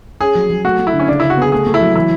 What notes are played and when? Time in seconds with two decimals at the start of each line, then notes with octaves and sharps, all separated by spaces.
0.21 C#4 G#4
0.35 F#3
0.50 F#3
0.64 A3 F#4
0.79 A3
0.87 E4
0.93 D3
0.99 C#4
1.08 C#3 D4
1.20 C#3 E4
1.30 F#4
1.37 B3 G#4
1.52 A3 G#4
1.67 A3
1.74 E4
1.81 F#3
1.95 E3 E4